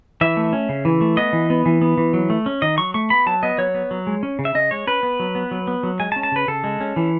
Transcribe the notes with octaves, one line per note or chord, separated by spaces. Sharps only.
E3 E5
A3
C#4
C#3
E3
A3
B3 D#5
E3
B3
E3
B3
E3
F#3
A3
C#4
D#3 D#5
F#3 C#6
A3 C#6
B3 B5
F#3 A5
B3 D#5
F#3 C#5
B3
F#3
G#3
C#4
C#3
E5
C#3 D#5
G#3 C#5
C#4 B4
B3
F#3
B3
F#3
B3
F#3
G#3 G#5
A5
C#4
A5
C#3 B4
C#3 A4
G#3
C#4
E3